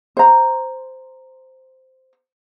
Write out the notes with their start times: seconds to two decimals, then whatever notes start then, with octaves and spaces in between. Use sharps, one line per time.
0.17 C5 A#5